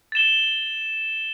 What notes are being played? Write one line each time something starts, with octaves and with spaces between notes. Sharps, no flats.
A6 E7 G7